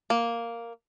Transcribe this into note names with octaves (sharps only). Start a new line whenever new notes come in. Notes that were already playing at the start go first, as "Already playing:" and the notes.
A#3